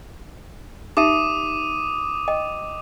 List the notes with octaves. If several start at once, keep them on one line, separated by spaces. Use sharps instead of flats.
D#4 G4 E5 D6 D#6 D#7
D#5 G5